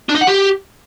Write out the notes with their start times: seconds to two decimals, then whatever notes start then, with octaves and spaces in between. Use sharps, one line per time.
0.09 D4
0.15 D#4
0.21 F#5
0.27 G4